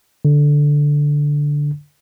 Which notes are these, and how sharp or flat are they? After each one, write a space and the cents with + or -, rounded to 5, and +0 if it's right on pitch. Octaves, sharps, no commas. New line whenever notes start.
D3 -5